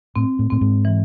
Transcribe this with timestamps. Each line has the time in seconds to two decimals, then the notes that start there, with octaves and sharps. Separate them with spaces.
0.16 A2 C4
0.39 A2
0.50 A2 C4
0.61 G#2
0.85 E3